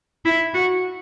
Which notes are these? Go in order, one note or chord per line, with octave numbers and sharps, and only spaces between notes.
E4
F#4